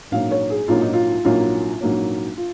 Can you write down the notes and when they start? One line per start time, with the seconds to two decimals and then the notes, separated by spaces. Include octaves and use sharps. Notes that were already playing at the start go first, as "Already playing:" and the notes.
0.11 A#1 G#2 F#3 A#3 C#4 F5
0.31 C#5
0.50 G#4
0.68 A#1 G#2 F#3 A#3 C#4 F4
0.82 D#4
0.93 F4
1.25 A#1 G#2 F#3 A#3 C#4 F4
1.81 A#1 G#2 F#3 A#3 C#4
2.37 F4